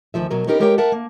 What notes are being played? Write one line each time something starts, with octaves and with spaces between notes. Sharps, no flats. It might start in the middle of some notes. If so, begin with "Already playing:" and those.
D2 D#3 F3 E5
B2 F#3 A#4
B3 C#4 D#4 G4 A#4 B4
G#3 G4 A#4 C#5 E5 G5
A#4 E5 F#5 A5
A#3